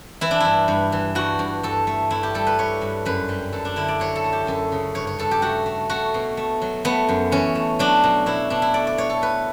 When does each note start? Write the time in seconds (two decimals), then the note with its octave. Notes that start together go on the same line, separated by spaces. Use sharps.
0.21 E3 E4
0.31 D4
0.40 G2 E4
0.68 G2
0.92 E3
1.15 G2 F#4
1.39 G2
1.63 G2 A4
1.87 A3
2.11 G2 E4
2.23 G4
2.35 G3 A4
2.46 B4
2.59 G3 C#5
2.81 G2
3.06 F#2 B4
3.29 G3
3.53 F#2 A4
3.65 D4
3.76 D3 E4
3.88 D5
4.00 F#3 C#5
4.16 A4
4.24 A3
4.33 G4
4.47 F#2 A4
4.72 C#3
4.95 G2 C#5
5.07 C#5
5.19 G2 A4
5.31 G4
5.42 A3 F#4
5.66 A3
5.90 A3 F#4
6.14 B2
6.37 A3
6.62 F#3
6.85 A3 B3
7.09 F#2
7.32 E3 C#4
7.55 A3
7.79 F#3 D4
8.04 B2
8.26 B2 E4
8.50 B2 D4
8.62 E4
8.74 A3 D5
8.87 D5
8.97 B2 C#5
9.10 A4
9.22 A3 B4